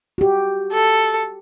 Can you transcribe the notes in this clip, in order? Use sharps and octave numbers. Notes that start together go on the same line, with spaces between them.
F#4 G4
A4